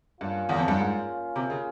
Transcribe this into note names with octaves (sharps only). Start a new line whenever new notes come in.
G2 A#3 C#4 F4
E2
F2
G2
G#2
C3
C#3